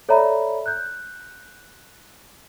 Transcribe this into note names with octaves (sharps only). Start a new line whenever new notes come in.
A4 C#5 D5 E5 A#5 B5
F#6 G6